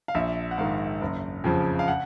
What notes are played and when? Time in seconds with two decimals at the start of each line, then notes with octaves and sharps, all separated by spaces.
0.08 F5
0.15 A#1 E5
0.51 F#5
0.58 G#2 D#3 F5
1.01 F#1
1.44 F2 C#3 F3
1.79 F5
1.88 F#5